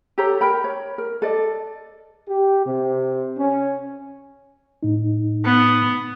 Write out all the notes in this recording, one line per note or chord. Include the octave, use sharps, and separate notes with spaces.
G4 A4 C#5 A#5
A#4 G5 B5
C#5
A#4
A4 D5 D#5
G4
C3
C#4
A2 D#4
B3